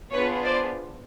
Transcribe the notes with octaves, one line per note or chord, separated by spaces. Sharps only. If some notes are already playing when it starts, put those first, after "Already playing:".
B3 D4 F4 G#4 B4 C#5
C5 D5